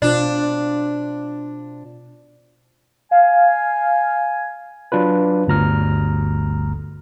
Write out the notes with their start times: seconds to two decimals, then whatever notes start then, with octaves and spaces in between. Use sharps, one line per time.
0.02 B2 D4 F4 C5
3.11 F5 G#5
4.92 F#3 D4 F4 B4
5.47 G1 D2 A#5 F6